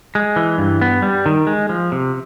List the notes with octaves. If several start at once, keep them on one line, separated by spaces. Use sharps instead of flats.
G#3
E3
G2
B3
G3
D#3
G#3
F3
C3